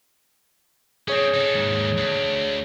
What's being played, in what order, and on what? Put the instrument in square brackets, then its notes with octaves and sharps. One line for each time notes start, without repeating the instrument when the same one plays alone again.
[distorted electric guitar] C4 C#4 [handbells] G#4 C#5
[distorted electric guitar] D#4 A4
D#2 G#2
D2